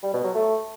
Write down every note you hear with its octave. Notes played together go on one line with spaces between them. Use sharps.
G3
B2
F#3
A3